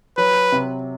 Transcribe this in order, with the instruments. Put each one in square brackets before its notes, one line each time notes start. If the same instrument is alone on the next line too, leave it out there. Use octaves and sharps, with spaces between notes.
[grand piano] F#3 [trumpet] B4
[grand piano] C3